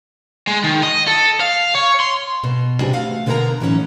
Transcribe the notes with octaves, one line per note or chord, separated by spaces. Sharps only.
G#3
D#3
D#5
A4
F5
C#5
C6
B2
C3 G#3 D4 F#4 G4 B4
E2 A3 F5 F#5
B2 D3 G#3 B3 A#4 A#5
A2 E3 F#3 C#4 D#4